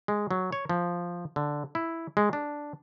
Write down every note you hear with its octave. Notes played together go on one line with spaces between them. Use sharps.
G#3
F#3
C#5
F3
D3
E4
G#3
D4